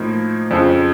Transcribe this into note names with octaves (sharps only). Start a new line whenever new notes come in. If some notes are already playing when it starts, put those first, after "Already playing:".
Already playing: A2 F3 A#3 D#4
F2 C#3 F3